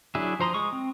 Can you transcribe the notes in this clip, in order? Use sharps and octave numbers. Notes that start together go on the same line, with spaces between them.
F#3 D4 E4 G#4 E5
F3 C5 A#5 C6 D#6
G#3 C#6 D#6
C4